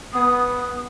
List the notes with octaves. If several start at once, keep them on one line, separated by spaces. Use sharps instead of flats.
B3 D#6